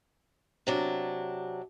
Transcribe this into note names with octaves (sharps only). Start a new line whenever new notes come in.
C3 F#3 D4